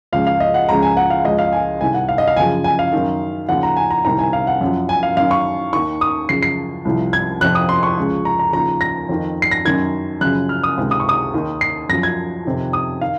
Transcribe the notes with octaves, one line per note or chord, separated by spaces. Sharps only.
C#2 C#3 F3 F5
F5
D#5
F#5
C#2 C#3 F3 A#5
G#5
F#5
F5
C#2 C#3 F3 D#5
F5
G#5
C2 C3 D#3 G#5
F#5
F5
D#5
F5
F#2 C#3 F3 G#5
G#5
F5
F#2 D#3
D#2 C#3 F3 F#5
A#5
G#5
A#5
C2 C3 D#3 A#5
G#5
F5
F#5
F#2 F3
G#5
F5
F#2 D#3 F5
C#6
D#2 D#3 C#6
D#6
F#2 C#3 F3 C7
C7
C2 C3 F3
G#6
F2 C3 F3 F#6
D#6
C6
C#6
C#2 C#3 F3
A#5
A#5
D#2 C#3 F3 A#5
A#6
F2 D#3
C7
A#6
F#2 D#3 G#6
F#2 C#3 F3 F#6
F6
D#6
C#2 C3 D#3
D#6
C#6
D#6
D#2 D#3
C7
F#2 F3 A#6
G#6
F2 C3 D#3
D#6
D#3 F5